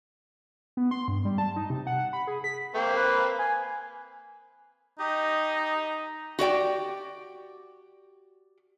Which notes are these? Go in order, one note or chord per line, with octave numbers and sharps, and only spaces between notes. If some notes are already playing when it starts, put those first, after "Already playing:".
B3
C6
G2
G3
A5
D#4
C3
F#5
B5
G#4
B6
A#3 C4 G5
B4
G#5
D#4 G4 D#5
F#4 G4 D5 G5